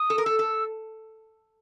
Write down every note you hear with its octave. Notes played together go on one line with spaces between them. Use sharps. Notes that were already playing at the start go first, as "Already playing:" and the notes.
Already playing: D#6
A4
A#4
A4 E6
A4